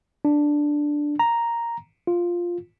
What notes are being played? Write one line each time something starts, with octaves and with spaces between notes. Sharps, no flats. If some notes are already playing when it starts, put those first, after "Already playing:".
D4
A#5
F4